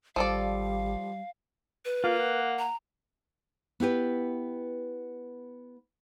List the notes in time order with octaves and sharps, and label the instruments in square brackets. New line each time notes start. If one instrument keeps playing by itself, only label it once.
[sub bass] G#1 [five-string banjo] F3 A4 D5 [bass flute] G3 [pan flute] F5
[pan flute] B4
[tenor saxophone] A#3 [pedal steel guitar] F4
[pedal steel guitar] F#5
[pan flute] A#5
[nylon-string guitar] B3 E4 G4 B4